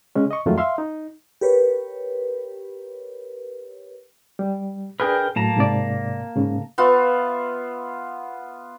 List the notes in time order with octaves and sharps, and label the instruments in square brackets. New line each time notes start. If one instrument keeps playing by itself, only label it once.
[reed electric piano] C#3 G#3 C#4
D#5 C#6
F2 D#3 F#3 G#3 A3 F4
E5 F5 C6
D#4
[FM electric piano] G4 A#4 B4 C#5
[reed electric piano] G3
[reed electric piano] D4 G#4 B4 [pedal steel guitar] A#4 G5
[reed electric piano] A2 F#3 [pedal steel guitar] A#3 A5 A#5
[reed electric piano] G#2 C3 D5
G#2 C#3
[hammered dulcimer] B3 F4 E5